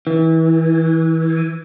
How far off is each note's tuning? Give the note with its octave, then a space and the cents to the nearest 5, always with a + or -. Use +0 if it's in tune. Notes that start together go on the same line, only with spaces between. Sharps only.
E3 -25